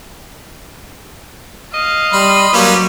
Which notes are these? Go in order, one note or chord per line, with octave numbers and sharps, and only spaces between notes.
D#5 F5
G3 B5 C6
F#3 G3 A#3 C#4 B4